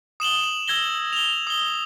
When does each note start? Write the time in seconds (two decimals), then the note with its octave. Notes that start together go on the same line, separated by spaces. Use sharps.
0.20 D#6 E7 F#7 G7
0.44 F#7
0.68 E6 G#6 A#6 G7
1.13 F7 G7
1.47 D#6 G7